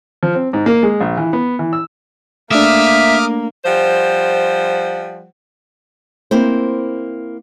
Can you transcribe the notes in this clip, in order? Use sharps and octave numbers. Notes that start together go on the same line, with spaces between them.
F3
C4
G#2
A#3
G#3
A#1
E3
B3
E3
E6
A3 A#3 D4 E5 D6 D#6 F6
F3 G3 C5 F#5
A#3 C4 E4 C5